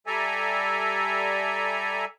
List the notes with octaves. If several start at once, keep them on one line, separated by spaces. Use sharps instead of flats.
G3 A4 D5 E5 G#5 A#5